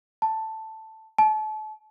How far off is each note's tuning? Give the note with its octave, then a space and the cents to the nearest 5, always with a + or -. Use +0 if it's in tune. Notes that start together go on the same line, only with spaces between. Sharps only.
A5 +5
A5 -35